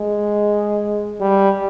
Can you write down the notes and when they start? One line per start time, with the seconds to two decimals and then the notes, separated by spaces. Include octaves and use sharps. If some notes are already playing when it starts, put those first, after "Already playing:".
Already playing: G#3
1.20 G3